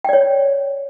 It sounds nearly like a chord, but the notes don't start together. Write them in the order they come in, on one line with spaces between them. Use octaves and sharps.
G5 D5 C#5